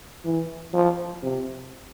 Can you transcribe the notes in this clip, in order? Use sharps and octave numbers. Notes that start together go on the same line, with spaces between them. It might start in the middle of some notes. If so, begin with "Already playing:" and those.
E3
F3
C3